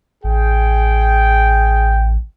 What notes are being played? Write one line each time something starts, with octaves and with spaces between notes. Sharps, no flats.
A1 G#4 G5